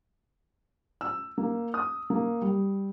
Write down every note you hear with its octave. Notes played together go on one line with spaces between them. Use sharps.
E6
A#3
D#6
A#3
G3